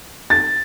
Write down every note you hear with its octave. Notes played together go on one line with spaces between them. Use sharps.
A6